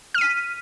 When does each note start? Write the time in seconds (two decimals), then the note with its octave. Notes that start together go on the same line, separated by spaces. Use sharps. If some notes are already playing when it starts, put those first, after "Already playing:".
0.14 F6
0.18 D#7
0.21 B6